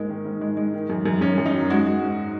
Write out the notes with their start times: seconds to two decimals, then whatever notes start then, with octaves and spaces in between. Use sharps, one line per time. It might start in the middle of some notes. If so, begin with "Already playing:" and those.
Already playing: G#2 G#3 A#3
0.09 D#3
0.25 G#2
0.41 G#3
0.57 G#3
0.74 D#3
0.90 F#2
1.06 F#2
1.21 F#2 C#4
1.38 F#2
1.46 D#4
1.54 F#3
1.70 G#3 F#4
1.87 G#3
2.03 G#2